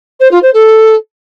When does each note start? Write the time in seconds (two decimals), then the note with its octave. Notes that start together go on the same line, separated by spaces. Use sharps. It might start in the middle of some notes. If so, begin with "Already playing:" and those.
0.20 C5
0.31 F4
0.42 C5
0.53 A4